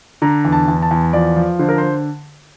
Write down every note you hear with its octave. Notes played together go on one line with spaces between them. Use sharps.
D3 A#5
E2
A5
E2
A5
E2
F3 D5
F3
D3 C5
A#4
C5